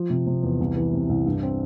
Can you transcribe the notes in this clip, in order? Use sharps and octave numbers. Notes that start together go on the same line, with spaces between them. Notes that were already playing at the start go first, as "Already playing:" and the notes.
Already playing: F3
C3
C3
E2
C2
E3
C3
C2
G2
C4